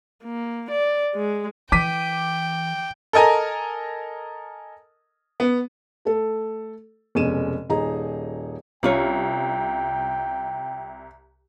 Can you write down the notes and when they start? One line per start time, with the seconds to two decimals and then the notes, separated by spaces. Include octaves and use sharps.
0.24 A#3
0.71 D5
1.15 G#3
1.72 E3 G5 D6 B6 D#7
3.13 A4 A#4 D#5 G#5 A#5
5.40 B3
6.05 A3 A4
7.15 F1 B2 G#3 C#4 D#7 E7
7.69 D#1 D#4 G#4 D#5 A#5
8.83 C2 C#4 F4 C#5 G5